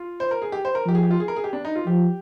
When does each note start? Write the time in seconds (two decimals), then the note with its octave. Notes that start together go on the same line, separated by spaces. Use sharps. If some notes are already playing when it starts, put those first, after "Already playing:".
Already playing: F4
0.20 C5
0.31 A#4
0.42 G#4
0.52 G4
0.65 C5
0.75 A#4
0.86 F3 G4
0.95 G#4
1.03 G4
1.11 F4
1.20 G#4
1.28 A#4
1.36 G#4
1.44 G4
1.53 D4
1.65 D#4
1.76 F4
1.86 F3 G4